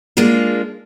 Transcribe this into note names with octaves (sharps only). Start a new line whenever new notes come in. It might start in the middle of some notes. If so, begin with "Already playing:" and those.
G#3 A#3 D4 F4